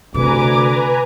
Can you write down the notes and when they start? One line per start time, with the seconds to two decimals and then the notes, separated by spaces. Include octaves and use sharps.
0.14 D2 C3 B4 G#5 A#5 D6